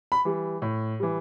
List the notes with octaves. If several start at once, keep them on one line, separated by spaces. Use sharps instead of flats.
B5
E3 G3
A2
E3 G3